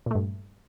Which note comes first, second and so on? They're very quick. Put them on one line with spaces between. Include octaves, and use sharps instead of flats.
A#2 A3 G2